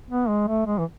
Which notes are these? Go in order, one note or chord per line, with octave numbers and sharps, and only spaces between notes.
B3
G#3
A3
G#3
E3